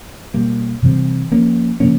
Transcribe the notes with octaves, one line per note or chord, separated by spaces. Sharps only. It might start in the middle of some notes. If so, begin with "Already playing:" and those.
B2 G3 A#3
C3 E3 G3 C4
F3 A#3 C#4
C#3 F3 A#3 C#4